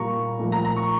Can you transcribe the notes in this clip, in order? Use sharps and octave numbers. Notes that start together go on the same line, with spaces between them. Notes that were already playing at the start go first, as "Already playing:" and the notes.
Already playing: A#2 G3 A#3 A#5 C#6
A#2 F3 A3
A#5
A#5
C#6